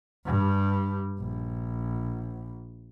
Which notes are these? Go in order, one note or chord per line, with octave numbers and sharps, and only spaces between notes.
G2 G3
A#1